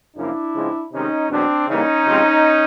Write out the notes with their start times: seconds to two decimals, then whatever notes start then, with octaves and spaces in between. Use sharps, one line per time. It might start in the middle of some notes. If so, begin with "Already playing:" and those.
0.16 F#2 C#3 F3 A#3 D4 E4
0.55 C#3 F3 G#3 C4
0.93 C3 D#3 G#3 C#4 D#4
1.30 E2 B2 F#3 C4 D4
1.68 C#3 E3 G3 A#3 C#4 D#4
2.06 C3 F3 G#3 C4